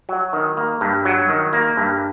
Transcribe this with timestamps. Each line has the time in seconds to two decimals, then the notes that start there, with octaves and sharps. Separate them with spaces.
0.09 F#3
0.33 D#3
0.57 A#3
0.81 G2
1.05 F#3
1.29 D#3
1.53 A#3
1.77 G2